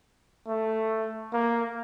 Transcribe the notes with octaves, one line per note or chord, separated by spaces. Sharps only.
A3
A#3